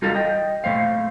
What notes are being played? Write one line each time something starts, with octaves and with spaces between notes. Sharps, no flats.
G3 D#4 F4 F#4 A4 F5
D#5 G5
A#2 D#3 A3 C5 F5